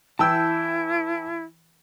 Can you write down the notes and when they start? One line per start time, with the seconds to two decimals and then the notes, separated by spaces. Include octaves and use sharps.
0.19 E3 E4 G5 A5 E6 G6